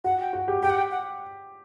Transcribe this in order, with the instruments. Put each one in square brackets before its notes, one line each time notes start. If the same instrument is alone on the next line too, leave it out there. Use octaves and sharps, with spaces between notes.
[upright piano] F#4 [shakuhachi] F#5
[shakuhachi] G5
[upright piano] F#4
G4
[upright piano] G4 [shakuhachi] G5
[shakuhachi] F#5
G5
F#5